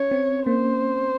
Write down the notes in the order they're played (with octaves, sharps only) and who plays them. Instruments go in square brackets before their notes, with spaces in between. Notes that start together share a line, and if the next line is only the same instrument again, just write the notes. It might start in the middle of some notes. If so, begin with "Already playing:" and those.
Already playing: [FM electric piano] C#4 [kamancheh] C#5
[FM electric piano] C4
[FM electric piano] A#3 [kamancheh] C5